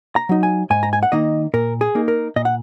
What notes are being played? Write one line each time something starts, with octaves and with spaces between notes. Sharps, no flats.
A#5
F#3 D#4
G#5
G#2 G#5
A#5
G#5
F#5
D#3 A#3 D#4 D#5
A#2 A#4
G#4
A#3 D#4
A#4
A#2 D#5
F#5